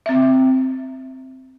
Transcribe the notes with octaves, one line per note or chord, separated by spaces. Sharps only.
C4 E5